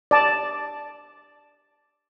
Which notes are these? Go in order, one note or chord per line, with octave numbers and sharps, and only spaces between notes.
D5 A5